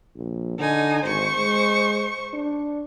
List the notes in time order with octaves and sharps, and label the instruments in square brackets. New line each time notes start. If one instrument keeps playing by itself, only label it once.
[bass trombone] A#1
[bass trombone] D3 [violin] D#4 G#5
[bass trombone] G#1 [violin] C5 C#6
[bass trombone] G#3
D4